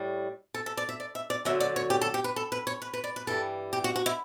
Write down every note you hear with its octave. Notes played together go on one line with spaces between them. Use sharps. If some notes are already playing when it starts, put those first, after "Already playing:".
Already playing: A2 G3
A4
A4
D5
E5
D5
E5
D5
D2 D3 F#3 E5
D5
C#5
G4
A4
G4
B4
A4
B4
C#5
B4
B4
D5
B4
G2 E3 G3 A4
G4
F#4
F#4
E4